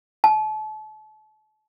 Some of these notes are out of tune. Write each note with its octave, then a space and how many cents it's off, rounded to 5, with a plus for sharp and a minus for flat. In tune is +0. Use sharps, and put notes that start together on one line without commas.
A5 -35